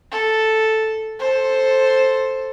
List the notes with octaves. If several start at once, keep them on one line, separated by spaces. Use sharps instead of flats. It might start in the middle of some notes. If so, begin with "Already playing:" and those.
A4
A4 C5